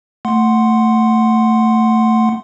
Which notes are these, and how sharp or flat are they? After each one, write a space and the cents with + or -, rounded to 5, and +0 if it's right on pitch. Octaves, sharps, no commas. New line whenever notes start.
A3 +15 F#5 +0 C6 +0